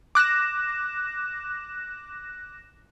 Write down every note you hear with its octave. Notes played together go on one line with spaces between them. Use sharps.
D6 F#6 A#6 E7